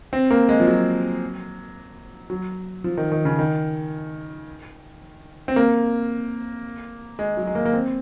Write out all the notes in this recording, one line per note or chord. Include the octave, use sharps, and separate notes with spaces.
C4
A#3
G#3
F3
F#3
F#3
F3
D#3
D#3
C#3
D#3
C4
A#3
G#3
F#3
G#3
A#3
A#3
C4